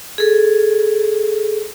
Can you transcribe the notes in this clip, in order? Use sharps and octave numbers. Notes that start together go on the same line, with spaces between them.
G#4 A4